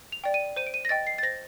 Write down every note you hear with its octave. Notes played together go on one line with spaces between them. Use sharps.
F7
D5 G5
D#7
C5 D#7
D7
D#7
A#6
D#5 G5 A6
C7
A6
C5 A#6